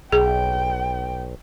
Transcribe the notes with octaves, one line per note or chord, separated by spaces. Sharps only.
B1 G#4 G5